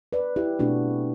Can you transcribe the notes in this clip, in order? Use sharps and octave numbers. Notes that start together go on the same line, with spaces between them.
B4 D5
E4 G4
B2 A3 C4 D4 F#4